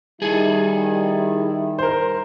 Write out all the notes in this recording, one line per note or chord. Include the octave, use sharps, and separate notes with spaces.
D#3 G3 E4 G#4 A4
A#4 C5